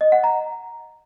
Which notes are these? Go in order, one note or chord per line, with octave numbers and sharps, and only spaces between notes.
D#5
F#5
A#5